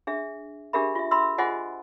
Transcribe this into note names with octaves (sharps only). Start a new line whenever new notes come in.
D4 G#4 E5
D4 G4 G#4 A#4 E5 B5
F4 E5
E5 B5 C6 E6
F4 G#4 C5 D#5 F#5 G#5